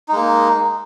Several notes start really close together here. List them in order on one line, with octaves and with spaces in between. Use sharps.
D#4 G#3 A#3